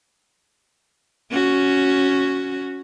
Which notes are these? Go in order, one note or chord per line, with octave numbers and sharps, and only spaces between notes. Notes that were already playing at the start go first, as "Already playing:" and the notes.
C#4 F#4